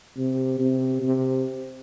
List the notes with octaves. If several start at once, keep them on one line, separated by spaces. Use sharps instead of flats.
C3
C3
C3